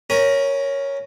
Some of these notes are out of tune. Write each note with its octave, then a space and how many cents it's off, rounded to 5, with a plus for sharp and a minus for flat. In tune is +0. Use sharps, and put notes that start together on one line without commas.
C#4 +0 A#4 +0 A#5 +40